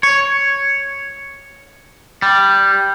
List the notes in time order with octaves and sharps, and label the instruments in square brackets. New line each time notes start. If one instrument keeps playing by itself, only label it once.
[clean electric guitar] C#5
G3